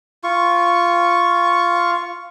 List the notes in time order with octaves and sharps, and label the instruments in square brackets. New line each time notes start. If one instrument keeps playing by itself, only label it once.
[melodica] F4 C#6